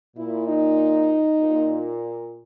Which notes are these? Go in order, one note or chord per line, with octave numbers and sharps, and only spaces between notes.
A#2 E4
D#4
A#2